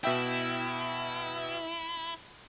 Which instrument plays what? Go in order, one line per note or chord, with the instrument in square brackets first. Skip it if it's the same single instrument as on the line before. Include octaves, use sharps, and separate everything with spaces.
[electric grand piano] B2 E5 G5 [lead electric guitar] E4